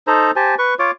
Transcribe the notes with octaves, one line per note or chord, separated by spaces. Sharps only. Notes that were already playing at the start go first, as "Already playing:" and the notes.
D#4 A4 C5 A#5
G4 C5 G#5 A5
B4 C#6
F4 C#5 D6